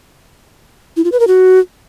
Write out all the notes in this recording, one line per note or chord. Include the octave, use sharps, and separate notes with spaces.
E4
F4
B4
A#4
F#4